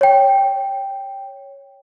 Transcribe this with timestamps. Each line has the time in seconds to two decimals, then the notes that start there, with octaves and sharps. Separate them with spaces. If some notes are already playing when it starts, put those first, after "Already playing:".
0.01 C#5 G5